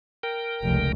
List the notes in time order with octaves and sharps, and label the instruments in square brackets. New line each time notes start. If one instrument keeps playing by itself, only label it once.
[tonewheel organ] A#4 G5
[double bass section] F1 C#2